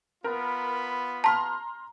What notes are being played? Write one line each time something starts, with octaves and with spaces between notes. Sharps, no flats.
B3 F4 A#4 B5
A5 A#5 C6 F6 B6